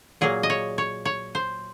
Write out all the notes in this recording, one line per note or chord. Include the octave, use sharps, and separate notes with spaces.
A#2 F#3 A#3 G#4
D#5
C#5
C#5
C#5
C5